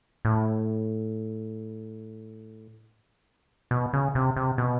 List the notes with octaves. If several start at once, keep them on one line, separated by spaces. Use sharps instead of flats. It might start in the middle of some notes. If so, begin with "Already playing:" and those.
A2
B2
C#3
C3
C3
B2